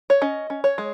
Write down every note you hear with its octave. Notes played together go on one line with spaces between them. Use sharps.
C#5
C#4 D#5
C#4
C#5
G#3